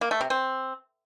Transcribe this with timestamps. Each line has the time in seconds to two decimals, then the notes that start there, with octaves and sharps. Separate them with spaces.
0.01 A#3
0.11 A3
0.21 C3
0.30 C4